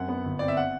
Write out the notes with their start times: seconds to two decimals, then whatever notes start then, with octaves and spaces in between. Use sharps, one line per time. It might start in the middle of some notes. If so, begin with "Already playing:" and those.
Already playing: F#2 C4 F#5
0.08 B3
0.25 G1
0.39 C4 D5
0.48 E5
0.57 F#5